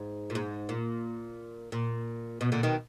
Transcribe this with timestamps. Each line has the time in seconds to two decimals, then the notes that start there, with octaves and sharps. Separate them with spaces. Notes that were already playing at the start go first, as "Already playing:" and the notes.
Already playing: G#2
0.30 A#2
0.35 G#2
0.69 A#2
1.72 A#2
2.41 B2
2.52 A#2 D3
2.63 B2 D#3